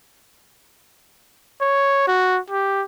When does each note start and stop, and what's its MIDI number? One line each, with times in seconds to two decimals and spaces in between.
1.61 2.06 73
2.08 2.39 66
2.50 2.83 67